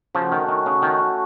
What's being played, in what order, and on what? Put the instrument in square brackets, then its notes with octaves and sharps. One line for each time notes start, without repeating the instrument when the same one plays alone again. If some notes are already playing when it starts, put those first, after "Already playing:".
[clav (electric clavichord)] C#3 F3 [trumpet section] A3 C#4 F#4
[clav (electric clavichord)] D#3
D#3
C#3
D#3